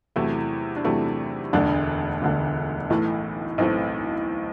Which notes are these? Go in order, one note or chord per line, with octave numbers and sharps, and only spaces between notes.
E2 C3 F#3 A3 E4
D4
E2 C3 F#3 A3 E4
E1 D2 D3 D4
E1 D2 D3
B1 A2 E3 A3
B1 A2 E3 A3 C4